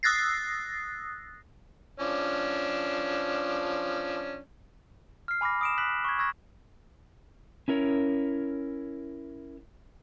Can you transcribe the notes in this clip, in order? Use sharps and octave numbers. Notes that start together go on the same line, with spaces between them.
D#6 E6 F#6 A6 A#6 C7
F3 C#4 D4
F6 C7
G#5 B5 D6 F6 A#6
D#6 D7 E7
F#6 B6 F#7
C#6 G#6
C#6 E6 G#6 A#6
C#4 E4 A#4 C#5